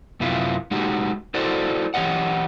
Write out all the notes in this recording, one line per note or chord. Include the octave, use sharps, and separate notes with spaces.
F#2 C3 B3 E4 F4
G#3 D#4 F#4 G4
E4 F#4 A4 C5 D5
E3 G4 C#5 D#5 F#5